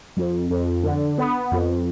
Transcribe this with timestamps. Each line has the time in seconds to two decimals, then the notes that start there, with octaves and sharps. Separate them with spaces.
0.17 F2
0.50 F2
0.83 D3
1.18 B3
1.52 F2